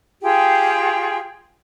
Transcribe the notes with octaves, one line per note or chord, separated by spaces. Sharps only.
F4 G4 G#4 G5